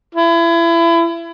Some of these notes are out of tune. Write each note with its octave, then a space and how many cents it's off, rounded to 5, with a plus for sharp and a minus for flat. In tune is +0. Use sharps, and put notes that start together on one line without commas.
E4 +30